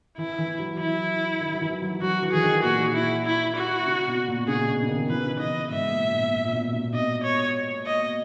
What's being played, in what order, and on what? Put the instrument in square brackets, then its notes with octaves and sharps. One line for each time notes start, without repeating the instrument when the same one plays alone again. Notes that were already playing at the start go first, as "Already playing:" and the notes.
[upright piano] E3 [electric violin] E4
[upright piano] E3
F#3
[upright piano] F#3 [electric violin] E4
[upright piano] D#3
F#3
E3
F#3
[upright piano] F#3 [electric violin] F#4
[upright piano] E3
[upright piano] E3 [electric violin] G#4
[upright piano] D#3
[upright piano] A#2 [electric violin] F#4
[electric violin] E4
E4
F#4
[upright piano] C#3
B2
A#2
[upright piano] C#3 [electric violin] G#4
[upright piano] B2
C#3
D#3
[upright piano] E3 [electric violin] B4
[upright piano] C#3
[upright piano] B2 [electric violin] D#5
[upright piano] G#2 [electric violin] E5
[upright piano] A#2
B2
A#2
A#2
B2
B2
[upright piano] B2 [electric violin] D#5
[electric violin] C#5
D#5